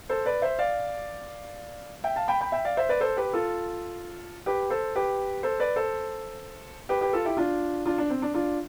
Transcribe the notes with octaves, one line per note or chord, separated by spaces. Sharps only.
A4 C5
B4 D5
C5 E5
D5 F5
E5 G5
F5 A5
G5 B5
G5 B5
E5 G5
D5 F5
C5 E5
B4 D5
A4 C5
G4 B4
F4 A4
G4 B4
A4 C5
G4 B4
A4 C5
B4 D5
A4 C5
G4 B4
G4 B4
F4 A4
E4 G4
D4 F4
D4 F4
D4
C4
D4
D4 F4